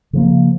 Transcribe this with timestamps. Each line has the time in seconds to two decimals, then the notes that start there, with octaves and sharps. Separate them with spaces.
0.13 C#3 F3 A#3